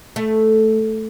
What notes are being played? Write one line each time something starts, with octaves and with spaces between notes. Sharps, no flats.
A3